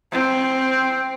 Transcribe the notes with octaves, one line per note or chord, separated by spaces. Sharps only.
C4